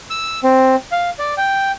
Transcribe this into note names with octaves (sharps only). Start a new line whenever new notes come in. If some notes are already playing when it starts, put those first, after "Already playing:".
E6
C4
F5
D5
G5